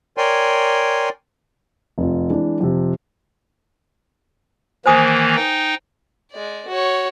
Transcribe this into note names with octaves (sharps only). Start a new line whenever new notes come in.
A#4 C#5 D5 G5 G#5 C6
F1 F4
E3 G#3 D4
F2 C3
D#3 E3 A#3 C5 G#5 D#6
D#4 G5
G#3 D5
F#4 C#5